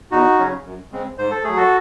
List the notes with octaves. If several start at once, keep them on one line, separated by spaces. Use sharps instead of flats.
E2 D#4 F#4
C#3 F#3 C#4
F#2
C#3 G#3 C4
G#2 C5
A4
F#3 A3 G#4
F#4 A4